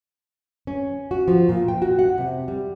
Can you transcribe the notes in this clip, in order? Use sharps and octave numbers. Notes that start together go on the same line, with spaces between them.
C#4
F#4
F3
A#2
G5
F#4
F#5
C3
G3